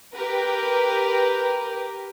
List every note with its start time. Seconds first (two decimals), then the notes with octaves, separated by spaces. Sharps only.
0.13 G4 A#4 B4